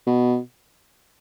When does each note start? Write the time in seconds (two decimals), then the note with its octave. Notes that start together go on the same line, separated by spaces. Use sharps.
0.07 B2